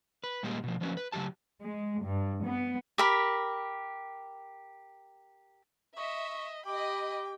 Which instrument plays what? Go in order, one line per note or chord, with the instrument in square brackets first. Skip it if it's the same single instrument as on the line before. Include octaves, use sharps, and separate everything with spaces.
[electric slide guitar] B4
A#2 G3 G#3 A#3 G4
B2 F3
F3 F#3 A#3 C#4 B4
B4
C#3 F#3 A3 G4 A5
[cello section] G#3
G2
B3
[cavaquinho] G4 A#4 B5
[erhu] D#5 [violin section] E5 [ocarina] C#6
[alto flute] G4 [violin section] D#5 B5 [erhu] G5 [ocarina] D6